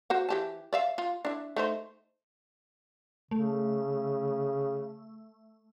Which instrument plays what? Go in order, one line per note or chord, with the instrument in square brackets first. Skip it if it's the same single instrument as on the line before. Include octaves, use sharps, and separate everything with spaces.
[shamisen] F#4 C5 F#5
E3 G4 A5
D5 E5 F5
F4
D4 E4
A3 D#4 C5
[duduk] C#3 [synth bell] A3